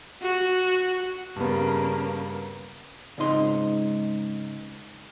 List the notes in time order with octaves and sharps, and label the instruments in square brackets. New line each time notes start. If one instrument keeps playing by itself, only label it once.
[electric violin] F#4
[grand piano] G2 B3 [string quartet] C#3 A#3
[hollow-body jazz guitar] C#2 G#2 C4 D#4 C6